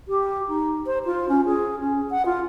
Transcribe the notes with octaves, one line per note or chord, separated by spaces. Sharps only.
G4
D#4
C5
F4
C#4
G#4
C#4
F#5
F4